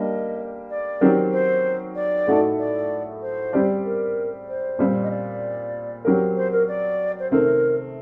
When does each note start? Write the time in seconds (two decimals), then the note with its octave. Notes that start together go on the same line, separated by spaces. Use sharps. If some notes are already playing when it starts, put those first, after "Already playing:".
Already playing: G3 A#3 D4 G4 A#4 D#5
0.70 D5
1.01 D#3 F#3 C4 G4 A#4
1.33 C5
1.96 D5
2.27 A2 A3 D#4 F#4 A4
2.59 D5
3.22 C5
3.53 G3 C4 G4 D5
3.85 A#4
4.48 C5
4.79 A#2 G3 C4
5.03 D#5
5.11 D5
6.05 F#3 C4 G4 A#4
6.37 C5
6.52 A#4
6.68 D5
7.19 C5
7.31 C3 D#3 A3 C4 A#4